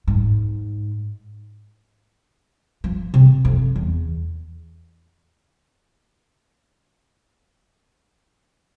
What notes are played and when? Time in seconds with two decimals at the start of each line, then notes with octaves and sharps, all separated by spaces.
0.07 G#2
2.84 F3
3.14 C3
3.45 F2
3.76 E2